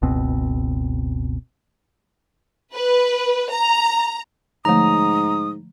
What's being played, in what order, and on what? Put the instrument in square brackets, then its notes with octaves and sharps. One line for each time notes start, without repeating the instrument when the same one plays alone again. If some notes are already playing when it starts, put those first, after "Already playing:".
[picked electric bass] F#1 C#2 B2 C4
[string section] B4
A#5
[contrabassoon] G#2 [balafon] D3 F3 A3 [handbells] A#5 [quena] D#6